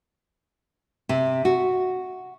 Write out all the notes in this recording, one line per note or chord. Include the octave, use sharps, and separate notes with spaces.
C3
F#4